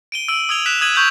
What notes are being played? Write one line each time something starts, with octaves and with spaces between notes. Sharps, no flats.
D7 D#7 G7
E6 D7 D#7 F#7
D#6 E6 G#6 D#7 F7 G7
F#6 B6 E7 F7
D#6 G#6 D#7 F#7
C#6 G6 G#6 B6 F7